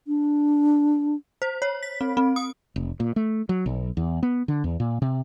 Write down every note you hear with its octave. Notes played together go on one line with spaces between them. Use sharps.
D4
C5
C#5
B6
C4
C4
D#6
F1
A#2
A3
F#3
B1
E2
B3
D3
E2
A#2
C3